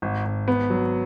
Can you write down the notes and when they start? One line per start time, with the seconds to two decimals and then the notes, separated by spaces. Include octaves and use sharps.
0.02 G#1
0.25 G#1
0.48 B3
0.70 F#3